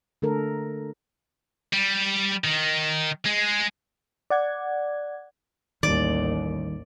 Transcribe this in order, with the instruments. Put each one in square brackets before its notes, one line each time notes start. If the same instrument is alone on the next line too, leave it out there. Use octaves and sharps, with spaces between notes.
[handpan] D3 A3 A4 A#4
[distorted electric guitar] G3
D#3
G#3
[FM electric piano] D5 F#5 G#6
[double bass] A1 D#2 [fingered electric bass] D#3 G3 [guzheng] D5